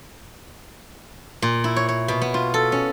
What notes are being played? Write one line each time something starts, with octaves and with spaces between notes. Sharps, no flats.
A#2
E4
C#5
C#5
B2
B3
F4
A4
C#4